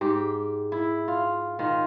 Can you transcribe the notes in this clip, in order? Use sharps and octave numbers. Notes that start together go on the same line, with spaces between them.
G#2 G4
E4
F4
D#3 F4